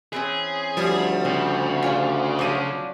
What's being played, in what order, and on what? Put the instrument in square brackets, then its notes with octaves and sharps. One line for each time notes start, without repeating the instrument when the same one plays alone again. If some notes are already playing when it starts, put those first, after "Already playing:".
[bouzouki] E3 C4 C#4 [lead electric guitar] G#4
[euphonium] D2 [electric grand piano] F3 G3
[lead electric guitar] C#3 [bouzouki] C4
[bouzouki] F4 G#4 D5
[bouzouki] F3 F#3 D4 [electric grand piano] D6 D#7